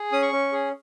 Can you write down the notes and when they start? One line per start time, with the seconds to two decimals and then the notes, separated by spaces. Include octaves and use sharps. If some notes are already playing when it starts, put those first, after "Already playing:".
Already playing: G#4
0.12 C#4 D#6
0.22 C#6
0.33 C#4
0.52 G#4